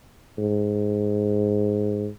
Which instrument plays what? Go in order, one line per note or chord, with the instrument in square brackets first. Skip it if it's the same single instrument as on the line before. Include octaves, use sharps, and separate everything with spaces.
[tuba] G#2